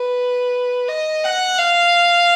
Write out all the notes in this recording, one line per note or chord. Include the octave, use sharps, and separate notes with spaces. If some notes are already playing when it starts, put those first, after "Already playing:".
Already playing: B4
D#5
F#5
F5